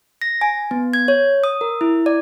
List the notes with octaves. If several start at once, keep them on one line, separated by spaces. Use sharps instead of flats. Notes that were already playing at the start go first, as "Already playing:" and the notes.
A#6
G#5
B3
G#6
C#5
D#6
A#4
E4
D5